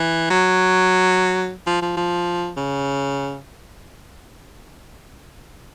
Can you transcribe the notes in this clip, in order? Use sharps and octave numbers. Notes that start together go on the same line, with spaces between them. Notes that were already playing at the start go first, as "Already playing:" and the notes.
Already playing: E3
F#3
F3
F3
F3
C#3